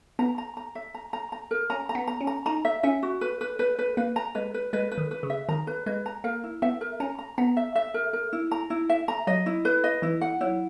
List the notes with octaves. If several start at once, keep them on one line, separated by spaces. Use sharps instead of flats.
B3 A#5
A#5
A#5
E5
A#5
A#5
A#5
A#4
C#4 A#5
A#5
B3
A#5
C#4
A#5
D#4 A#5
E5
C#4 E5
F#4
B4
B4
B4
B4
A#3 B4
A#5
G#3 B4
B4
G#3 B4
B4
D#3
B4
C#3
E5
D#3 A#5
B4
G#3 B4
A#5
A#3 A#4
E4
B3 E5
A#4
C#4 A#5
A#5
B3 A#5
E5
E5
A#4
A#4
E4
A#5
E4
E5
A#5
F#3 D#5
E4
B4
D#5
E3 E4
F#5
F#3 E4